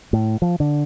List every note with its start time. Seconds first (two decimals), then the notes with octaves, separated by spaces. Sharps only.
0.13 A2
0.42 F3
0.60 D3